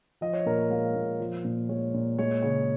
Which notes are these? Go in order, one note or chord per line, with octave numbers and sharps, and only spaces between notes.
F3 D#5
C#5
A#2 A#4
C#5
G#3 F5
A#2
F3
A#2
G#3 C#5
A#2
G#3 C#5
C#3 C#5